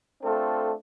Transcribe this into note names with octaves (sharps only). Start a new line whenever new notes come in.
A3 C4 D4 F4 A4